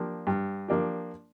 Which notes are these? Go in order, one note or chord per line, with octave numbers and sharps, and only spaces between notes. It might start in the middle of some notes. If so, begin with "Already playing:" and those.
Already playing: F3 A#3 D4 G4
G2
F3 A#3 D4 G4